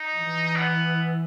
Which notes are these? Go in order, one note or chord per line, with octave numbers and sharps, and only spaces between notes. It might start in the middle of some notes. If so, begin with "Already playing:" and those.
Already playing: D#4
E3
B3